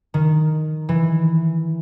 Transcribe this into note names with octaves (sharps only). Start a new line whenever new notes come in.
D#3
E3